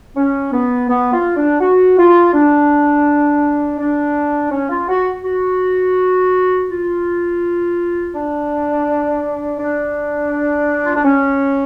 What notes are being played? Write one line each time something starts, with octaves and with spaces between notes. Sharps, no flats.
C#4
B3
B3
F4
D4
F#4
F4
D4
D4
C#4
F4
F#4
F#4
F4
D4
D4
F4
D4
C#4